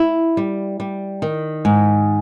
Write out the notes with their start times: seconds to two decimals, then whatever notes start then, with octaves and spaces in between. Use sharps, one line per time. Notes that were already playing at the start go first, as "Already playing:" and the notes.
Already playing: E4
0.37 G3
0.80 G3
1.22 D#3
1.65 G#2